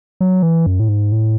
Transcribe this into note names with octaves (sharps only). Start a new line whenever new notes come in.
F#3
E3
F#2
A2
G#2
A2